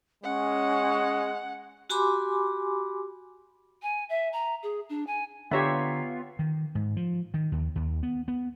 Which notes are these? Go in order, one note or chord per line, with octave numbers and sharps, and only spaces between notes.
G#3 C#4 F#5
F#4 G4 G#5 B5 C6 D6
G#5
E5
A#5
G#4
D4
G#5
D3 B3 F4 G4 C#5 E5 A#5 C6
D#3
G#2
F3
D#3
D#2
D#2
B3
B3